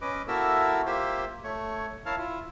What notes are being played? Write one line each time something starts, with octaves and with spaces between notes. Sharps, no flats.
C#4 B4 D#5 D6
A#3 E4 F#4 A4 A#4 E5
A#3 F4 G4 C5 E5
A3 C#5
E4 A#4 C#5 F5 A5 F6
E4 F4